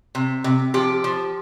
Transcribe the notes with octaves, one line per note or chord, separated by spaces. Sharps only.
C3
C3
F3 G4
F3